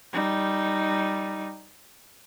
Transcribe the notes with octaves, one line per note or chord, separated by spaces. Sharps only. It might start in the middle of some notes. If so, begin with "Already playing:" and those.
G3 D#4